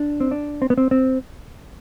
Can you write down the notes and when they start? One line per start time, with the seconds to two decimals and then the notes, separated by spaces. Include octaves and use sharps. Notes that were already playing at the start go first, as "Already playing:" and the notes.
Already playing: D4
0.20 C4
0.31 D4
0.62 C4
0.70 B3
0.78 C4
0.91 C4